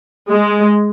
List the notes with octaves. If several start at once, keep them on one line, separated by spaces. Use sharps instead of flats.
G#3